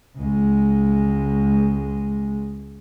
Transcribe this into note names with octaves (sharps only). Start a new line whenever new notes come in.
C#2 G#3